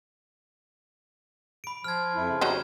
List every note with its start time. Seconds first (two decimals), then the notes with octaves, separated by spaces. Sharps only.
1.64 B5 D7
1.84 F3 F6 G#6
2.15 F2 E4
2.29 C#3
2.41 F#3 G3 D#4 G#6